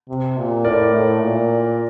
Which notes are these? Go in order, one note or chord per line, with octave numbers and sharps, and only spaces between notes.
C3
A#2
A2 A#4 D5
A2
A#2